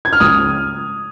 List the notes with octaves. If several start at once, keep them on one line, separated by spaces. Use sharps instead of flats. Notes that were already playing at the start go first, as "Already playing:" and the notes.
G#6
F6
C#2 D#6